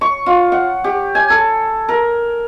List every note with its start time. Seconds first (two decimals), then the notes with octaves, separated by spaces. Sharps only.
0.01 C#6
0.26 F4
0.52 F#5
0.84 G4
1.15 G#5
1.30 A4
1.89 A#4